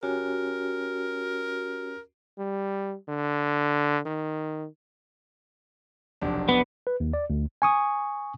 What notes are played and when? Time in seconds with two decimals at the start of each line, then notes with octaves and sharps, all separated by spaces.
0.03 C#4 F#4 G4 A#4
2.39 G3
3.09 D3
4.06 D#3
6.22 F1 B1 D4
6.49 B3
6.87 B4
7.00 D#2
7.13 D5
7.30 D2
7.62 G#5 C#6 D#6